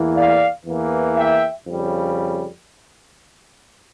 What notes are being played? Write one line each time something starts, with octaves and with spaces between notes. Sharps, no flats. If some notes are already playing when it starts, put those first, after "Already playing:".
Already playing: E2 E3 A#3 E4
D5 F5
E2 E3 A#3
E5 G5
F2 C#3 G3